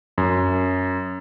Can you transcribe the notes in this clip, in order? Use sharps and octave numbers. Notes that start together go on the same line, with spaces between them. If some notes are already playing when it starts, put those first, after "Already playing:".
F#2